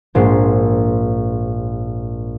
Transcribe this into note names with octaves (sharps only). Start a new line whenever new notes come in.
A#1 G#2 C7